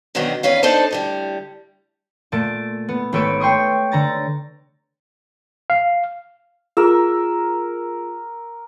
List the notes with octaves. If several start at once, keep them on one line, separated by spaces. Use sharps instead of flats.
B2 D3 D#3 F#3 B3 C4
E2 D#3 C#4 B4 F5
D4 D#4 A4 C5 D5
A2 D3 G3
A#2 A3 A5 D7
B3
G#1 A3 A4 B4 C#5 D7
C#5 G5 C6 C#6 D#6
D3 A#5 A6
F5
F4 G#4 A#4 E6